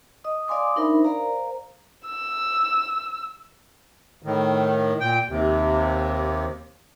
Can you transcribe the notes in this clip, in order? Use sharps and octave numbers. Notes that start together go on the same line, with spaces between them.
D#5 D#6
D5 F5 G#5 C6 D6 D#6
D4 D#4 A#4 C5 E5 B5
A#4 C5 D5 F5 A#5
E6
A2 D#3
A#2 G5
D#2 C3